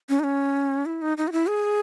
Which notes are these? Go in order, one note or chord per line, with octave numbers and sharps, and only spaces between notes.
C#4
D#4
C#4
E4
D#4
D#4
F#4
E4
G#4